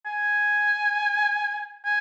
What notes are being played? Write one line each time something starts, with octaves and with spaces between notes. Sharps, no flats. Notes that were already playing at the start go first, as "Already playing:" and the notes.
G#5
G#5